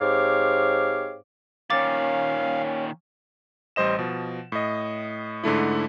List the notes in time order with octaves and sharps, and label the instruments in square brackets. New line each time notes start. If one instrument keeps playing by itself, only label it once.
[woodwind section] G#2 C4 G4 C#5 F5 D6
[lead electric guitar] A#2 D#3 [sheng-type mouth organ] C#4 [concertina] F5 [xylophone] D6 A6
[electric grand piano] A1 G3 C5 D#5 E7
B2 F3
A2 D#5
G#2 D3 A3 E4